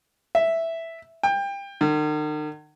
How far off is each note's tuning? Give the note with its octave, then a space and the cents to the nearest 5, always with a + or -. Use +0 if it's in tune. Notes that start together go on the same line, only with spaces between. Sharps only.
E5 +0
G5 +25
D#3 -45